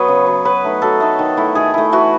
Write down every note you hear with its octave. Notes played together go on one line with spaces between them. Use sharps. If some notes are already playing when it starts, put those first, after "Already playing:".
Already playing: F#3 B3 B4 C#5 D#5
C#3
F#3 B3
F#3 B4
A3 D#4
F#3 A4
A3 D#4
D#3
A3 E4
D#3 G#4
A3 E4
E3 F#4